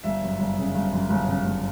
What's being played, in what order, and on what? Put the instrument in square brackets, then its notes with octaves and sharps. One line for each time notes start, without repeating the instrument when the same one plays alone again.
[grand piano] G1 E5
F#2
G1
C#3
G1
F#2
G1
C#3
G1